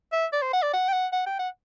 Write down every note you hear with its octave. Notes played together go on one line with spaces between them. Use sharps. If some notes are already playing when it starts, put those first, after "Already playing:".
E5
D5
C5
F#5
D5
F#5
G5
F#5
F#5
G5
F#5